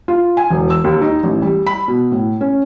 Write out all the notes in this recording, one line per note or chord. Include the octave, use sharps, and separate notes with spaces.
F4
G#5
E1
E6
D#2
D#4
A1
G3
B5
B2
A2
C#4